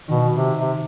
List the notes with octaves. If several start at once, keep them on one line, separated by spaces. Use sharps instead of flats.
B2 D#3
C3
C3